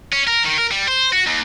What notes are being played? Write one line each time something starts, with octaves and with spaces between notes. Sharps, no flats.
C#4
A#4
D#3
A#4
G3
C5
F#4
D#2